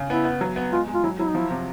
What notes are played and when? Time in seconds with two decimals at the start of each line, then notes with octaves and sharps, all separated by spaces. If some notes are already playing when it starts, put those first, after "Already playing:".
Already playing: C#3
0.10 B3 E4
0.25 B3
0.41 F#3
0.56 B3
0.72 G#3 F4
0.88 G#3
0.94 F4
1.04 F#3 E4
1.19 F#3 E4
1.28 D#4
1.35 F3 E4
1.51 C3